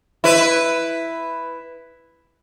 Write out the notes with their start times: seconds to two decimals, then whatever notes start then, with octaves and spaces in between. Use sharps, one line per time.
0.24 E4 B4